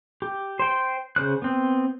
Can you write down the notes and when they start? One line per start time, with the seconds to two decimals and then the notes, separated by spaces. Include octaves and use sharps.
0.22 G4
0.59 C5 G5
1.16 C#3 C5 F#6
1.42 B3 C4